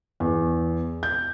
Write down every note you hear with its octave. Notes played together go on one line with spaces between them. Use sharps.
E2
G6